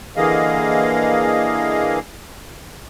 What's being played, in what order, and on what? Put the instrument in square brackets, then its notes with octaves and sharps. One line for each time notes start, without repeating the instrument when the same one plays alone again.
[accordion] D3 E3 A#3 G#4 D#5 F5